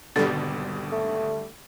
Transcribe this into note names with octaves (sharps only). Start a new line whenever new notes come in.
G#1 B2 D3 G3 A4
A3